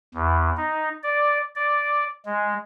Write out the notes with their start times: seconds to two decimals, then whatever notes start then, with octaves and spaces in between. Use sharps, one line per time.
0.14 E2
0.57 D#4
1.03 D5
1.56 D5
2.25 G#3